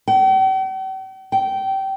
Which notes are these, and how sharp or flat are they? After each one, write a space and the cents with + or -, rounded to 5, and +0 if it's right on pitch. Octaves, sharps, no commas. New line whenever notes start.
G5 -45
G5 -20